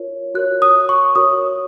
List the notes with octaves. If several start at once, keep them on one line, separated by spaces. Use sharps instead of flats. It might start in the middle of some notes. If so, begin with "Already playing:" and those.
Already playing: F4 A#4 C#5
F#4 A#4 C#5 F#6
D#6
C#6
F#4 A#4 C#5 D#6